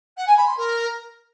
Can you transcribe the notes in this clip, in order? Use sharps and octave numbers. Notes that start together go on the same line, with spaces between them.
F#5
G#5
B5
C6
A#4